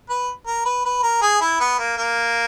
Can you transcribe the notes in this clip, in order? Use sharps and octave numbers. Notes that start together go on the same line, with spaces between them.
B4
A#4
B4
B4
A#4
G#4
E4
B3
A#3
A#3